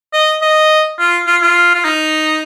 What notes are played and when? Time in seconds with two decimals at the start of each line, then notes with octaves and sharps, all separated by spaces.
0.13 D#5
0.42 D#5
0.99 F4
1.27 F4
1.42 F4
1.75 F4
1.85 D#4